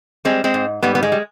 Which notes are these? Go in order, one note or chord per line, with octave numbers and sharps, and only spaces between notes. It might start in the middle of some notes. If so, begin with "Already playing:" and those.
G3 G#3 C4
G#3 C4
G#2
G#2 G3 B3
B3
G#3
G3